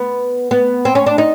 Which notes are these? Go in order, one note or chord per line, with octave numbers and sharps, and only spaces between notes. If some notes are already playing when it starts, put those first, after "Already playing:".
Already playing: B3
B3
C4
C#4
D4
D#4